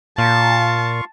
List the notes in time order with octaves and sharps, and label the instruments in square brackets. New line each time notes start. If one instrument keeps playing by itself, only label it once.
[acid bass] A#2 [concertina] F4 F5 C#6 [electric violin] A5